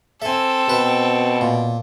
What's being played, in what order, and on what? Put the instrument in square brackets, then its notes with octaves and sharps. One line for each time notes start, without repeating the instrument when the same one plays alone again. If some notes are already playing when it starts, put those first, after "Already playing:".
[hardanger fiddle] C4 A4 [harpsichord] E5 G#5
[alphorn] B2 [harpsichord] B4
[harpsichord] A#2